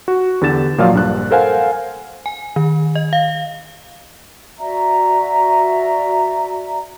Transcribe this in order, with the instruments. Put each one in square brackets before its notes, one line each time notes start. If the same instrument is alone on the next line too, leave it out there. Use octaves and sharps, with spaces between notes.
[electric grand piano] F#4
E2 D3 G4 A6 E7
A#2 F3 F#3 F4 D5 F5
A#1 G2 F#6
A4 A#4 C5 F5 F#5 G#5
[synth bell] G#5
D#3
D#5
F5
[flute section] F#4 D5 E5 A#5